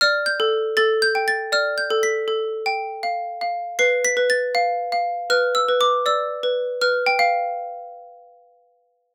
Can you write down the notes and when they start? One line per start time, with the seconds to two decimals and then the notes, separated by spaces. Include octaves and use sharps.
0.01 D5 F6
0.26 G6
0.40 A4
0.77 A4 A6
1.02 G6
1.15 G5
1.28 A6
1.52 D5 F6
1.78 G6
1.90 A4
2.03 B6
2.28 A4
2.66 G5
3.03 F5
3.41 F5
3.79 B4 C7
4.05 B6
4.17 B4
4.30 A6
4.55 F5
4.92 F5
5.30 B4 F6
5.55 E6
5.69 B4
5.81 D6
6.06 D5 E6
6.43 B4
6.81 B4 F6
7.06 G5
7.19 F5